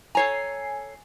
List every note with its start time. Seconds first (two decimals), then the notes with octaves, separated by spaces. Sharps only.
0.15 A4 C#5 G#5 A#5 C7